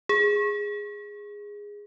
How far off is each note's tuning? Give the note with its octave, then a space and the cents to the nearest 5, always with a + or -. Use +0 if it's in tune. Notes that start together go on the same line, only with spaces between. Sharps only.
G#4 -10